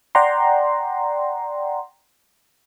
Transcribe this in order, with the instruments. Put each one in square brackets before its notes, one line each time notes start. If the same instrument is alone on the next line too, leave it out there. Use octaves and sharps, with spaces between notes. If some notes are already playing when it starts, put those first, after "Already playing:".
[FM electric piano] D5 F#5 G5 A#5 C6